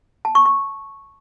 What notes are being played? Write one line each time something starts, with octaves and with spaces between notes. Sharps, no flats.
A5
C#6
C#6